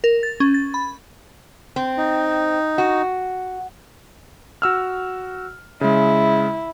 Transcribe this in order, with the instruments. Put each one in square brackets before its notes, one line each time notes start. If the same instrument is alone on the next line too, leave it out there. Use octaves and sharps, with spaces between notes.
[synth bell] A#4
A6
C#4
A6
B5
[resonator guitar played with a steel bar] C4
[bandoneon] D#4
[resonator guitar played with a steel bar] F#4
[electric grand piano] F#4 E6 F6
[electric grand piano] C#3 G#3 [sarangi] E4